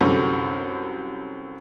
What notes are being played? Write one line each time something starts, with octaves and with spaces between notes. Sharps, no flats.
C2 F#2 D3 A4